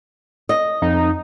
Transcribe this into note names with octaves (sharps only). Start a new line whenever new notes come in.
D#5
F2 D#4